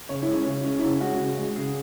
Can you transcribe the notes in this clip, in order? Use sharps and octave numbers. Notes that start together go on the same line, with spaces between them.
C#3 C#5
E4
G#3
C#4
C#3 C#4
G#3 C#4
E4
C#3 C#4
G#3 F#4
C#3
G#3
C#3 G#4